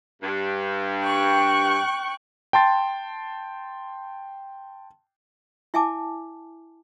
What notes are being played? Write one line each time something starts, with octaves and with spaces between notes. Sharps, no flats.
G2
G5 C#6 F#6
G5 A5 C6 A6
E4 E5 G#5 A5 D6